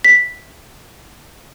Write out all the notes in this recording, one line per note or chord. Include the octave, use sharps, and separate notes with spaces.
B6